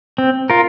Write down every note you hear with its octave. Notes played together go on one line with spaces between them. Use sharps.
C4
F4 A#4